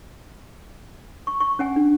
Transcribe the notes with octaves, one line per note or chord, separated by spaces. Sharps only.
C#6
C#6
C#4 F#5 G#5
D4